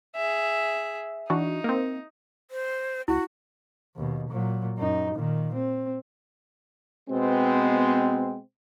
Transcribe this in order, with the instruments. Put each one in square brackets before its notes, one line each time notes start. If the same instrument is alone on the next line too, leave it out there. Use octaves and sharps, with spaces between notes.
[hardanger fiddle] G#4 E5
[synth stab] E3 D4 F#4 [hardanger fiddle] D#4
[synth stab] A#3 C4
[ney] C5
[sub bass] C#2 [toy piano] E4 [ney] F#4
[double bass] D#2 B2
A#2 F#3
F#2 D#4
A#2 D#3
C4
[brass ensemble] B2 G#3 B3 C4